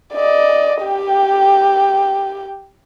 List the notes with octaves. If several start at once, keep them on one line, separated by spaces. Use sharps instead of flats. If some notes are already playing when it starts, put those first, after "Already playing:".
D5 D#5
G4 G5